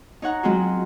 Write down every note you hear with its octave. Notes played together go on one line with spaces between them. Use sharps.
D#4 C#5 F#5 A#5
F#3 G#3 C4 F4 F#4